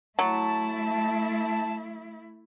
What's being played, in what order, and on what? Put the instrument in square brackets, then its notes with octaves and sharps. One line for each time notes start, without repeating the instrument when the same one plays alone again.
[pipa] F#3 [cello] A3 E4 [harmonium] A5